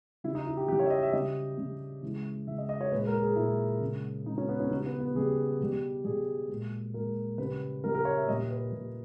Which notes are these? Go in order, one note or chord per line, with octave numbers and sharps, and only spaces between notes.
C#3 E3 G3 E4
D#4
E4
G4
C#3 E3 G3 G4
C#5
E5
D#5
E5
C#3 G3 D#5
C#3 G3
C#3 E3 G#3
C#3 E3 G#3 E5
D#5
D#5
C#5
A#2 G#3 B4
A#4
G#4
A#2 G#3 E4
C#3
G#3
C#3 G#3 D#4
C#4
B3
C#4
C#3 G3 D#4
B3
B3
C#3 G3 G#4
B2 G3
B2 G3 G#4
A#2 G#3
A#2 G#3 A#4
C#3 G3 B4
C#3 G3 A#4
A#4
C#5
E5
A#2 G3 D#5
B4
A#2 G3